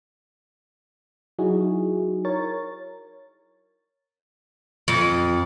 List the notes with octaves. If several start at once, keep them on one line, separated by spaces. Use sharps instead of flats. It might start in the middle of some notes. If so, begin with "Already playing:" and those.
F#3 D#4 E4 F#4 G#4
A#4 C#5 A6
F2